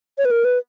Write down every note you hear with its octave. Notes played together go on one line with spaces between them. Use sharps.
C#5
B4
A#4
B4